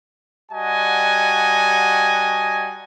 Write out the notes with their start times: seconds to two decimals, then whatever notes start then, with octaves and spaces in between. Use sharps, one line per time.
0.52 G3 F#4 D#5 F#5 G#5 A5